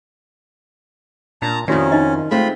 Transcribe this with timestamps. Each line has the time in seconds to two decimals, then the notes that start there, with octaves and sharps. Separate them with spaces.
1.42 A#2 D4 A5 A#5
1.68 F2 D#3 C#4 E4 F#4 D5
1.92 D#4 D#5
2.31 G#3 A3 C4 F4 B5